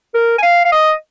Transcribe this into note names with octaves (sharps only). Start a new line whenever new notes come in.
A#4
G#5
F5
F5
D#5